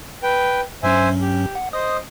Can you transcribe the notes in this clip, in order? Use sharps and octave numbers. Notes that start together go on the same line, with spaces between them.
B4 G5
G2 F#3 C#4 C5 E5 G#5
G4
F#5
C5 D#5 D#6